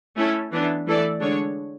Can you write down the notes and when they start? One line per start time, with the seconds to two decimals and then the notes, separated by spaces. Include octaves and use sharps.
0.17 A3 C#4 E4 A4
0.52 E3 B3 D4
0.86 E3 A3 E4 A4 D5
1.20 D3 G#3 D4 G#4 C#5